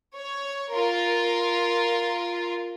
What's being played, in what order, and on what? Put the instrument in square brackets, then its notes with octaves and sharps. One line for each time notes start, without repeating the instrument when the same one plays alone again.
[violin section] C#5
F4 A#4